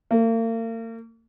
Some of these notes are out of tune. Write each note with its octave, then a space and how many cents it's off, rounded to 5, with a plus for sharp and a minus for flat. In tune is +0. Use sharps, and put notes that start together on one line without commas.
A#3 -45